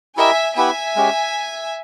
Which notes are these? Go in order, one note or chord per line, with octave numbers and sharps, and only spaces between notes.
E4 G4 A#4 D#5 E5 G#5
B3 E4 G4 B4 E5 G#5
G#3 C#4 G4